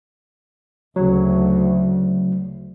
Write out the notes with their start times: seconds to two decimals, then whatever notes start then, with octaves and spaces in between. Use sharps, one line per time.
0.96 D2 C#3 F#3